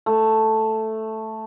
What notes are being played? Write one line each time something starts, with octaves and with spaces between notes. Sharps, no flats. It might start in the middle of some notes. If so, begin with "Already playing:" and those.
A3